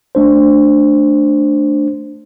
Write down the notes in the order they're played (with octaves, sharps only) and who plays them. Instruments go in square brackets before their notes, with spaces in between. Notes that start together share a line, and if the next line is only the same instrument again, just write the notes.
[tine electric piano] A3 D4 C5